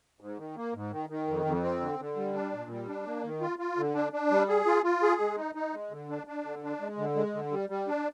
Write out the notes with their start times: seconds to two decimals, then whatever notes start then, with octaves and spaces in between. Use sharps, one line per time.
0.20 G#2
0.38 D#3
0.56 A#3
0.74 G#2
0.92 D#3
1.09 D#3
1.28 F2
1.45 F2
1.63 C4
1.80 D3
1.99 D3
2.16 G3
2.34 D4
2.53 A#2
2.71 G3
2.88 D4
3.06 A#3
3.23 D#3
3.41 F4
3.59 F4
3.77 D3
3.95 D4
4.13 D4
4.31 G3
4.49 G#4
4.66 F4
4.84 F4
5.03 G#4
5.20 G#3
5.38 D#4
5.55 D#4
5.73 G#3
5.91 D3
6.09 D4
6.27 D4
6.45 D3
6.63 D4
6.81 G#3
6.98 D3
7.16 G#3
7.34 D3
7.51 G3
7.70 G3
7.88 D4